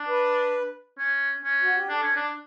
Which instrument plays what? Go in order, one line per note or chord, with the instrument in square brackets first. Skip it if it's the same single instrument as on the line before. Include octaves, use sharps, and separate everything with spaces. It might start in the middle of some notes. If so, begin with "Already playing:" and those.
Already playing: [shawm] D4
[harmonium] B4
[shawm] C#4
C#4
[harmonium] F#4
G4
[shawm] D4 [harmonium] A4
[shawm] C#4
D4